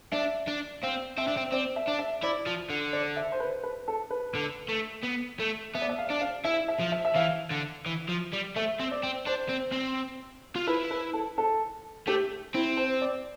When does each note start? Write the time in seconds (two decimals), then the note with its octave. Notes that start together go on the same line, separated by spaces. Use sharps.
0.12 D4 E5
0.47 D4
0.83 C4 F5
1.18 C4 E5
1.28 D4
1.37 C4
1.52 C4 D5
1.76 E5
1.88 D4
1.99 E5
2.23 E4 D5
2.46 F3
2.69 D3
2.93 D5
3.16 E5
3.32 C5
3.40 B4
3.63 B4
3.88 A4
4.11 B4
4.35 D3
4.69 A3
5.04 B3
5.40 A3
5.75 B3 E5
5.82 D5
5.89 E5
5.98 F5
6.10 D4
6.21 F5
6.45 E4 E5
6.68 E5
6.79 F3
6.92 E5
7.05 E5
7.15 E3 F5
7.51 D3
7.86 E3
8.08 F3
8.33 G3
8.56 A3 E5
8.80 C4
8.91 D5
9.03 C4
9.27 D4 C5
9.49 C4
9.73 C4
10.56 F4
10.67 E4 B4
10.91 B4
11.13 A4
11.38 A4
12.07 A3 G4
12.54 C4 E4
12.77 C5
13.02 D5